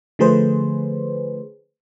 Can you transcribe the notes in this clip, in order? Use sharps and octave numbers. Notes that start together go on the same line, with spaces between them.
D3 F3 A3 G#4 B4 C5